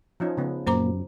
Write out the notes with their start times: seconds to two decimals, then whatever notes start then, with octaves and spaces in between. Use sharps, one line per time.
0.20 F3 C#4 D#4
0.37 C#3 B3
0.67 F#2 A#2 C5 A#5 D6